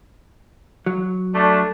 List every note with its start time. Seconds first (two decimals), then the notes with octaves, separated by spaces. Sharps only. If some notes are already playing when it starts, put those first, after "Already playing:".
0.86 F#3
1.35 A3 D4